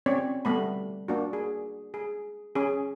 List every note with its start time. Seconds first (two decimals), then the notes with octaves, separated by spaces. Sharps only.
0.06 C4 C#4 C#5 D5
0.45 G3 A3 B3 B5
1.08 A#3 D4 F#4
1.33 G#4
1.94 G#4
2.55 C#4 G#4